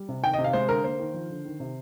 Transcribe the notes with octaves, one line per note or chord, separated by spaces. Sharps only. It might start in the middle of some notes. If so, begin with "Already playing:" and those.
Already playing: G3
C3
D#3 G5
C3 D#5
F5
G#3 C5
D3 A#4
A#3 C5
D#3
F3
D3
D#3
C3